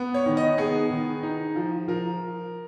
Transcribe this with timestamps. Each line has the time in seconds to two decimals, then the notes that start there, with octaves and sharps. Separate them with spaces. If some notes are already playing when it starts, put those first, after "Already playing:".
Already playing: B3
0.14 C#5
0.26 D#3
0.37 D#5
0.57 B3 G#4
0.90 D#3
1.23 D#4
1.56 F3
1.88 F3 A#4